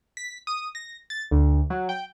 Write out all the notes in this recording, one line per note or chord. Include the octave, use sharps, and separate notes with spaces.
B6
D#6
A#6
A6
D2
F#3
G5